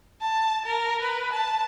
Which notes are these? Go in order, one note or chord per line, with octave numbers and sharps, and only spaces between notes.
A5
A#4
B4
A5